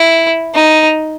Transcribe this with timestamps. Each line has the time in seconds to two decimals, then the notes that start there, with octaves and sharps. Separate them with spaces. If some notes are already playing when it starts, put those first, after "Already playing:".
Already playing: E4
0.55 D#4